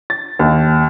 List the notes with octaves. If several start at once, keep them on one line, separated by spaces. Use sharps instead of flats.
A6
D#2